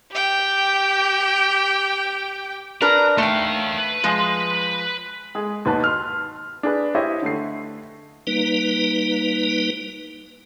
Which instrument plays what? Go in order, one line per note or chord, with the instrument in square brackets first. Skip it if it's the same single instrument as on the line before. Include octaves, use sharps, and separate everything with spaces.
[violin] G4 G5
[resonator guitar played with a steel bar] D4 A#4 B4 [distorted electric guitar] A#5
[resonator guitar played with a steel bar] A3 G5 [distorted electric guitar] D#4 F5
[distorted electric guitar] B4
[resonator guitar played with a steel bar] F3 G#3
[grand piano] G#3 G#4
D#2 B2 B4 A5
C6 F6
D4 G#4 B4
E4 G4 C5 C#5 D#5 E5
D3 A3 C7
[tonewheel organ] G3 A#3 D#4 B4